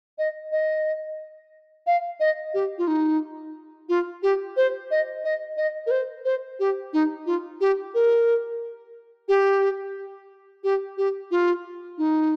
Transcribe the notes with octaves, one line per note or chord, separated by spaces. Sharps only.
D#5
D#5
F5
D#5
G4
F4
D#4
F4
G4
C5
D#5
D#5
D#5
A#4
C5
C5
G4
D#4
F4
G4
A#4
G4
G4
G4
F4
D#4